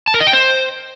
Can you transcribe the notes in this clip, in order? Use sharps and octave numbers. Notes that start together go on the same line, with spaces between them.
A5
A#4
D#5
G5
C5